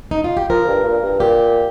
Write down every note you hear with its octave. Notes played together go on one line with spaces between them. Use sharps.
D#4
F4
G4
F3 A#4
G2
A#2
G2
A#2 G4